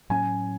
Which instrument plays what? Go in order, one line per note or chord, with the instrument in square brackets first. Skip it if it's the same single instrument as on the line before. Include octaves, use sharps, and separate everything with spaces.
[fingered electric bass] A2 F#3 C#4 [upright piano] G#5